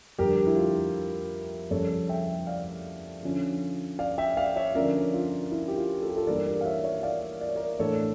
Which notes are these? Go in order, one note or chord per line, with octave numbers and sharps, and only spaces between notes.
F2 D3 G3 G4 A#4
E4
F4
F2 C#3 G3 A4 C#5
E5 G5
D5 F5
D3 F3 C#4
D5 F5
E5 G5
D5 F5
C#5 E5
D3 F3 C#4 A#4 D5
F4
E4
G4
F4
A4
G4
F4 A4
G2 E3 G3 A#3 A#4 D5
A#4 D5
F5
C#5 E5
C#5 E5
D5 F5
D5
C#5
A#4 D5
A2 E3 A3 D4 A4 C#5